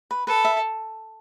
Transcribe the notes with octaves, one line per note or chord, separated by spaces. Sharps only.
B4
A4 B4
E5